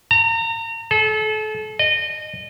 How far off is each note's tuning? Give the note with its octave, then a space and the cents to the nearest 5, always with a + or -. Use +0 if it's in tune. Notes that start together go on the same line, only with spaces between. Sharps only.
A#5 -35
A4 -35
D#5 -25